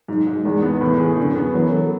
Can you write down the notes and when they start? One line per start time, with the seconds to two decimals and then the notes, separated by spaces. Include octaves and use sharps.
0.08 G#2 F#3
0.27 G#2
0.44 E2 G#3
0.63 B3
0.81 A2 E3
1.00 G#4
1.18 F#2 D3
1.36 B3
1.54 E3 F#3
1.72 A4